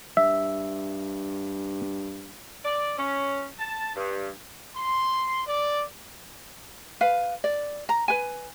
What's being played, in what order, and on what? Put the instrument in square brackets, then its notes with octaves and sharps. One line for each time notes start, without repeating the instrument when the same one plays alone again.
[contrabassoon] G2 [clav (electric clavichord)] E5
[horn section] D5
C#4
A5
G2
[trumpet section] C6
D5
[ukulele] B4 F5
D5
A#5
B4 G#5